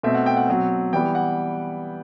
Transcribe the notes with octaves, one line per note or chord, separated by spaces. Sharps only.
B2 A3 C4 E5
F#5
G5
F#5
B2 F#3 C4
E3 G3 B3 G5
F#5